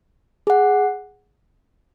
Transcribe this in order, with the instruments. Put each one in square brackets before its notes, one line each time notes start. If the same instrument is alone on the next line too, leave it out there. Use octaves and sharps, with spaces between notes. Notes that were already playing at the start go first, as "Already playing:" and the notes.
[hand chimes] G#4 F#5